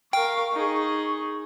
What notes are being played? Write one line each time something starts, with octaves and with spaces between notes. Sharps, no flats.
A#4 F5 G5 C#6
D#4 G#4